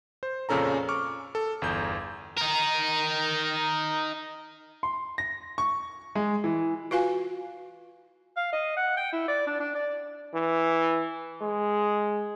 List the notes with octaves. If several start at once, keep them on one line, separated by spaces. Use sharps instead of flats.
C5
F2 A#2 C#3 C#4 A4 A#5
C#6 D6 F6
A4
G1 E2 G6
D#4 A#4
C6
A#6
C#6
G#3
E3
F4 F#4 B4 F5 G#5
F5
D#5
F#5
G5
E4
D5
D4
D4
D5
E3
G#3